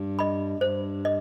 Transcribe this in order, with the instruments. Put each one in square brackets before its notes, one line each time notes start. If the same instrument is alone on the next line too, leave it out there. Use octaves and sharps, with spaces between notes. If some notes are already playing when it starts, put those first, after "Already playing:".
Already playing: [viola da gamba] G2
[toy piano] D#5 B5
[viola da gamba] G2 [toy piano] C5
[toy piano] D#5